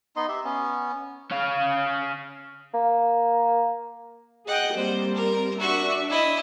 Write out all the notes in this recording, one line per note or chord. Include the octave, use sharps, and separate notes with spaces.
B3 D#4 D#5 C6
G4 E5
B3 C#4
C#4 F5
A#3
G#4 D#5 F#5 G5
G3 A#3 C4 C5
A#4
D4 F#4 E5 C#6
E4 D#5